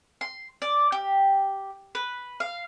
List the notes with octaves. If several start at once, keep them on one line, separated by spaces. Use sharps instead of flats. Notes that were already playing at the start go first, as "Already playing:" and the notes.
C6
D5
G4
B4
F5